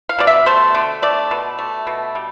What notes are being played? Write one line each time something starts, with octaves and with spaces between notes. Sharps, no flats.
F5
B2 D5
E5
A3 C5
D3
A3 D5
B2
A3
B2
G3